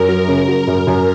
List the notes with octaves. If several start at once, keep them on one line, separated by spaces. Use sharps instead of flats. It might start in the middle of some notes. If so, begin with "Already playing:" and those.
Already playing: F#2 A#4
F#3
C#3
F#3
F#2 A#4
F#2